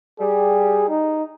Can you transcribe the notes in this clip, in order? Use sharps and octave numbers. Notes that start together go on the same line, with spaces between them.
G3 G#4
D#4